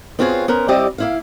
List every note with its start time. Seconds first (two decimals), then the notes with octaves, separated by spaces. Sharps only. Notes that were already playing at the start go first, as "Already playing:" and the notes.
0.19 B3 C4 F4 F#4 G#4 C#5
0.48 B3 C#4 A#4 C5
0.68 G3 C4 E4 G4 D5 D#5
0.98 A#3 E4 F5